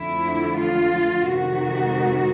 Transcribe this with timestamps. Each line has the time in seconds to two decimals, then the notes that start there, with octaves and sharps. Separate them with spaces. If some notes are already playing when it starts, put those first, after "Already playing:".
Already playing: F2 D3 F3 A3 E4
0.60 F4
1.31 F2 C3 D#3 G#3 F#4